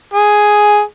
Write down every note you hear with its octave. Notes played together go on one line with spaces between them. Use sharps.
G#4